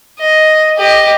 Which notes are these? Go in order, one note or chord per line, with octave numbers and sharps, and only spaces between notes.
D#5
G4 D#5